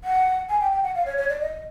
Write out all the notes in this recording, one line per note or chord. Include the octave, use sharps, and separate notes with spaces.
F#5
G#5
G5
G5
F#5
F5
C#5
C#5
D5
D#5